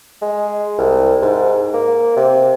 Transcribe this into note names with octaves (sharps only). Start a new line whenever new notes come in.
G#3
C2
G#2
A#3
C3